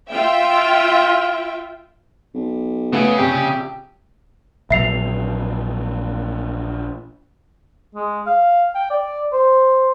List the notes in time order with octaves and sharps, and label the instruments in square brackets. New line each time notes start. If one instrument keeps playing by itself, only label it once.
[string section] F4 E5 G5
[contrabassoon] B1
[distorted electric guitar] C#3 [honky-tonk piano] A3 [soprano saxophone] B3
[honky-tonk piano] A#1 C3 [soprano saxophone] G4
[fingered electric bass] A#1 F#3 [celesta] E5 C7 F7
[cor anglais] G#3
F5
G5
D5
C5